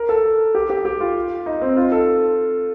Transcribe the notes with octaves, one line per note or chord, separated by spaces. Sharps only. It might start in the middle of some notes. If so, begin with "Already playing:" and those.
Already playing: A#4
A4
G4
G4
G4
F4
D#4
C4
F4
A4